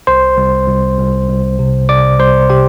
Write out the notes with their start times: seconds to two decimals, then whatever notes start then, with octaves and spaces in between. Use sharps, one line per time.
0.07 C2 C5 C6
0.37 C2
0.68 C2
0.99 C2
1.28 C2
1.59 C3
1.89 C3 D5 D6
2.19 C2 C5 C6
2.50 C3 G4 G5